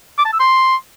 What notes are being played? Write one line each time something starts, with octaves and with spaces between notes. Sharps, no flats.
D6
A5
E6
C6